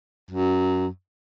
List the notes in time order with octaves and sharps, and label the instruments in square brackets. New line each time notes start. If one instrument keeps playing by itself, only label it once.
[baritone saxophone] F#2